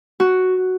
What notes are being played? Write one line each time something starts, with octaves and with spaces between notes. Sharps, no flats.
F#4